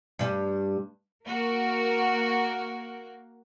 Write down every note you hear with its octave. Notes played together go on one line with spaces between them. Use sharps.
G2 G3
A#3 F#4 A#4